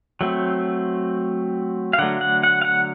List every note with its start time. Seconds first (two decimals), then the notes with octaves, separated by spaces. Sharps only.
0.21 F#3 A3 C4
1.93 F5
1.98 D3 F#3 A3 F#5
2.21 F#5
2.43 F#5
2.61 F5
2.65 F#5